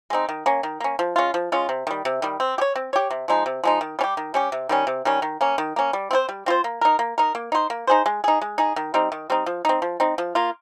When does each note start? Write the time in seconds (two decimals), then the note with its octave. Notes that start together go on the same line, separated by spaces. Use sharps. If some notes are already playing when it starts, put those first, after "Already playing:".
0.10 G#3 C4 D#4
0.29 D#3
0.46 A#3 C#4
0.63 D#3
0.80 A#3 C#4
0.99 F3
1.16 G#3 C#4 F4
1.34 F3
1.52 G#3 C#4 F4
1.69 C3
1.87 D#3 G3
2.05 C3
2.22 D#3 G3
2.40 C4
2.58 G4
2.61 C#5
2.76 C4
2.93 G4 C#5
3.10 C3
3.28 F3 G#3 D#4
3.46 C3
3.64 F3 G#3 D#4
3.81 D#3
3.99 G3 C#4
4.04 G4
4.17 D#3
4.34 G3 C#4 G4
4.52 C3
4.69 D#3 G3 C#4
4.87 C3
5.05 D#3 G3 C#4
5.22 D#3
5.41 A#3 C#4
5.58 D#3
5.76 A#3 C#4
5.93 G3
6.11 C4 F4 C5
6.29 G3
6.46 C4 F4 C5
6.64 A#3
6.81 D#4 A#4
6.99 A#3
7.18 D#4 A#4
7.35 A#3
7.52 D#4 G#4 C5
7.70 A#3
7.87 D#4 G#4 C5
8.06 G#3
8.24 D#4 G#4
8.41 G#3
8.58 D#4 G#4
8.76 D#3
8.94 G3 C4 D#4
9.12 D#3
9.30 G3 C4 D#4
9.46 F3
9.65 C4 D#4
9.82 F3
10.00 C4 D#4
10.18 F3
10.35 A#3 F4